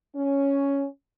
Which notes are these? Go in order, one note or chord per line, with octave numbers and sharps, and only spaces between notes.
C#4